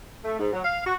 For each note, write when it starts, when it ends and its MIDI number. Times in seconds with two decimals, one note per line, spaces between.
0.25 0.38 57
0.39 0.50 44
0.53 0.63 54
0.65 0.83 77
0.85 0.94 66